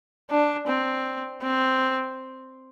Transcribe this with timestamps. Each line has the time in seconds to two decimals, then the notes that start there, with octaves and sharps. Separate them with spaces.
0.31 D4
0.67 C4
1.42 C4